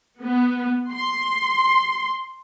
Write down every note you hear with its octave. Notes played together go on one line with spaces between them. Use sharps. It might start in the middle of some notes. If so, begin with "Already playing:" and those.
B3
C6